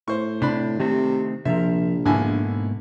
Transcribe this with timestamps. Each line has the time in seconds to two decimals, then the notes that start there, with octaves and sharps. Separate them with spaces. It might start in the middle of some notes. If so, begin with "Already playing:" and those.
0.08 A2 C5 C#6
0.42 C3 D4 B5
0.79 C3 D#3 A3 C4
1.45 A#1 C3 F3 A#4 E5
2.05 G#2 B2 D3 A#3 E4 G#5